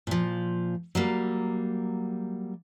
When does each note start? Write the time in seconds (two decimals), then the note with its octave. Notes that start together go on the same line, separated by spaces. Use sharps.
0.07 A#2 F3
0.95 F#3 G3 A#3